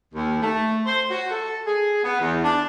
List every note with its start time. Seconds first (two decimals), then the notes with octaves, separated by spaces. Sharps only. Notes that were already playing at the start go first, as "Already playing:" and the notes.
0.14 D#2
0.41 A3
0.85 C5
1.10 F#4
1.31 A4
1.67 G#4
2.03 B3
2.21 E2
2.44 D4